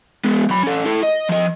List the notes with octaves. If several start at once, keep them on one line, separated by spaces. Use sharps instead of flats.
G#3 B3
F#3 B5
C#4 A4
E4 A4
D#5
F3 D#5